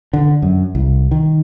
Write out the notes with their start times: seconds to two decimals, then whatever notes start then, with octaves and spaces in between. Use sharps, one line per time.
0.13 D3
0.42 F#2
0.75 C2
1.11 D#3